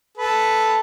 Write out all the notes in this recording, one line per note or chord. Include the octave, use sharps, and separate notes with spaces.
A4 B4